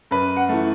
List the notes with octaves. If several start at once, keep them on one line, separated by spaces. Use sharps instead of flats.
F#2 B4
F#5
E3 A3